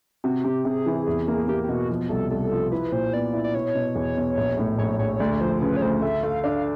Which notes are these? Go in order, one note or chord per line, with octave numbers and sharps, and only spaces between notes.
C3 F#4
C3 G4
C3 G#4
E3
E2
A#3
A#3 G4
G4
B2 F#4
F3
C2 A4
C2 A4
F3
E4 B4
A#2 C5
B3 D5
E4
D5
B2 C#5
B2
E2
B2
A#1
A2
A#1 C#5
A#1 C#5
D2 D5
F3 C5
C#3 B4
C#5
D2 C5
A3 E5
A3 F5
D4 F5